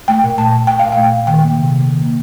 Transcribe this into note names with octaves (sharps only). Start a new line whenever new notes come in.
A3 G5
A#2
A3 A5
A#2
A3 G5
A#2 F5
A3 G5
A#2
D#3 G5
A#3
C3
C3
D#3
A#3